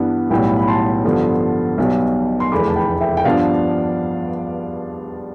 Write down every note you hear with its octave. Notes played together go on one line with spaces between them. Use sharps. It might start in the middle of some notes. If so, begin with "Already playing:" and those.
Already playing: G2 E3 B3 D4
B1 A2 G3 B3 G5 B5
B5
A5 C6
G2 D3 F3 B3
B1 B2 G3
C6
F1 E2 D3 A3 B5 D6
A5
G5 B5
E5 G5
G5
G2 F3 B3 D4 D5 F5